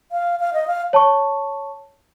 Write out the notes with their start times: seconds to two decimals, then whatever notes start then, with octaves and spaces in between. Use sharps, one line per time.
0.12 F5
0.40 F5
0.53 D#5
0.67 F5
0.93 C#5 A5 C#6